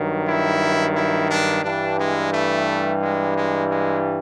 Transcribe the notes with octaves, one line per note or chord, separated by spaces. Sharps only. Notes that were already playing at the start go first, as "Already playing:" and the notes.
Already playing: G2 D#3 F#3
E4
E4
D4
G2 E3 G3 D4
G#3
A3
G#3
G#3
G#3